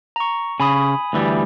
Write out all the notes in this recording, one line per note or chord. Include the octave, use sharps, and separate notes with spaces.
A#5 C#6
C#3 G#5 B5 D#6
D2 E3 G3